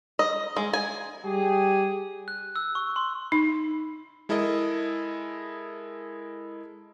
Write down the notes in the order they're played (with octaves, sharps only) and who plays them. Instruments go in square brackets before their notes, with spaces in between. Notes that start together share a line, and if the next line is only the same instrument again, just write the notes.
[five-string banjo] D#5
G#3
G#5
[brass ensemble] G3 G4 G#4
[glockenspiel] F#6
E6
C#6
C6
[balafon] D#4
[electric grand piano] G#3 E4 A4 A#4 D#5